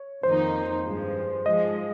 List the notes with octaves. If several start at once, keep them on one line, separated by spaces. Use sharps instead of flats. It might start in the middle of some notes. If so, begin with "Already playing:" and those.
Already playing: C#5
F2 D#3 A#3 D#4 C5
G2 F3 G#3
G#2 F3 G#3 D#5